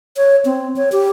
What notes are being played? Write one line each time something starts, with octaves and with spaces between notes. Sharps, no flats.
C#5
C4
C#5
G4